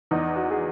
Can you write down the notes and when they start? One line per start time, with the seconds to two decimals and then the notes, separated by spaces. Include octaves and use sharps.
0.11 E2 D#4
0.35 F#4
0.50 G#4